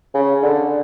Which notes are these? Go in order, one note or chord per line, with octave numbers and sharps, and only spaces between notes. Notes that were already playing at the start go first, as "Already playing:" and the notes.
C#3
D3